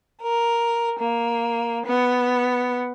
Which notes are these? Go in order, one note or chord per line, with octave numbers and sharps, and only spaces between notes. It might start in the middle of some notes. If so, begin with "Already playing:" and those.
A#4
A#3
B3